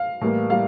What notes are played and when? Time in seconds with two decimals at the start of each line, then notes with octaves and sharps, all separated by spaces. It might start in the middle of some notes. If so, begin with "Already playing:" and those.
Already playing: F5
0.21 A2 E3 G3 A#3
0.50 G3 A#3 F5